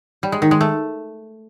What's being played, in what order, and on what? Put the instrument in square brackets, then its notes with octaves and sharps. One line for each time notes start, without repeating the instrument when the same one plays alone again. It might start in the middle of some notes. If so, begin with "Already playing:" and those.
[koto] G3
G#3
D#3
G#3
A3